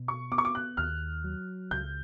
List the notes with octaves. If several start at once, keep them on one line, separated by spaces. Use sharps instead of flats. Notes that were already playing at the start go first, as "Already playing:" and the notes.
Already playing: B2
C#6
B3 D6
C#6
D6
F#6
D#2 F6
F#3
C#2 G6